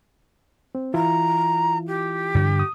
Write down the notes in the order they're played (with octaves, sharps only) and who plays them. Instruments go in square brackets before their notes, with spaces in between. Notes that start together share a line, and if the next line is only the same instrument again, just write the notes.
[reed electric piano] C4
[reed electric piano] E3 E4 F4 [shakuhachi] A#5
[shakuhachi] G4
[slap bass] G2 D3 D4
[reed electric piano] D#6